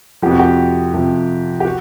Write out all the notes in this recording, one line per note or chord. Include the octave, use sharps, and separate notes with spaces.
F2 C3 F3 G4
F#4
G4
F2 C3 F3
G4
F#4